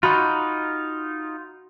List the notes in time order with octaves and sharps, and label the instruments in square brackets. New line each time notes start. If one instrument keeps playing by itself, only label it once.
[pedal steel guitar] D#4 F4 [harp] F#4 B5